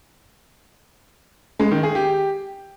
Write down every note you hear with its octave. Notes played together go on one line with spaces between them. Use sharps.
G#3
D#3
G#4
G4